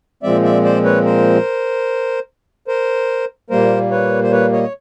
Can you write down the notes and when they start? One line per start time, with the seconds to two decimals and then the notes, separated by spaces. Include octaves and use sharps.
0.23 A#2 F3 G#3 C4 D5 E5
0.44 D5 E5
0.64 C5 D5
0.84 B4 C#5
1.05 A#4 C5
2.68 A#4 C5
3.50 A#2 G3 A#3 A#4 C5
3.91 B4 C#5
4.23 C5
4.32 B4 C#5
4.52 C#5 D#5
4.63 C#5